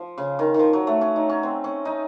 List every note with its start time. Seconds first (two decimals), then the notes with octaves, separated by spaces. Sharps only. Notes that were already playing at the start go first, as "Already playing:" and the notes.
Already playing: F3
0.18 C#3
0.39 D#3
0.54 D#3
0.59 F3
0.73 F#3
0.87 A3
1.01 C#4
1.16 D#4
1.29 C#4
1.43 C4
1.64 C#4
1.85 D#4